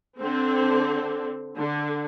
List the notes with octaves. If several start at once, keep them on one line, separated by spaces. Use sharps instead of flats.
D3 C4
D3